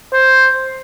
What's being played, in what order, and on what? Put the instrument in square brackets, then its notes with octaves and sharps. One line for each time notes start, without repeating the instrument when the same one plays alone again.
[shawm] C5